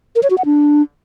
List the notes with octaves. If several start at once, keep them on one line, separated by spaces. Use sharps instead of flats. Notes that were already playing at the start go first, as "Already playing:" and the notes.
A#4
C#5
F#4
F#5
D4